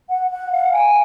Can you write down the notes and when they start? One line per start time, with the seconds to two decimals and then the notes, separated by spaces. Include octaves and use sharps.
0.10 F#5
0.31 F#5
0.52 F5
0.73 G#5